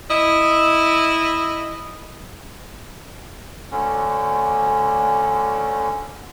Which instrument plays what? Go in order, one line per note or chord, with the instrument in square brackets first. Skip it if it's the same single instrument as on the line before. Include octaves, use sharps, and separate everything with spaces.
[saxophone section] E4 D#5
[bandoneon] D2 D3 C#4